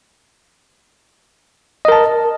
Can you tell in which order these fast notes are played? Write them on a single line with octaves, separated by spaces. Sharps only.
D#5 A#4 A5